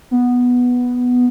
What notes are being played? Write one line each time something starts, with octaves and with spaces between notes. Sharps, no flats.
B3